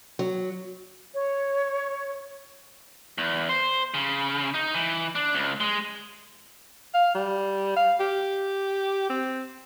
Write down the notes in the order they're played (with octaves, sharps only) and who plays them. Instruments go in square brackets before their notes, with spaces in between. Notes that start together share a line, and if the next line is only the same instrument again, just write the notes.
[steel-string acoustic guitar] F#3
[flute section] C#5
[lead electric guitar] E2
C5
C#3
D#4
E3
D4
C#2
G#3
[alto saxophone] F5
G3
F5
G4
C4